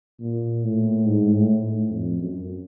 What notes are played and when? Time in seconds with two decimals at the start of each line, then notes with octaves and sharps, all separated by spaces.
0.21 A#2
0.64 A2
1.06 G#2
1.34 A2
1.63 A2
1.91 F2
2.19 F#2